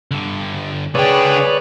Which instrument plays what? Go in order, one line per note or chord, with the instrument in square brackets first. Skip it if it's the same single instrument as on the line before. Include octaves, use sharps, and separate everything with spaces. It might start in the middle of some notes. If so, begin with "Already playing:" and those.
[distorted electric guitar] G2 D3
[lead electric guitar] C#2 G5 [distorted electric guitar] D3 D4 [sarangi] G#4 [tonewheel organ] B4 C#5 D5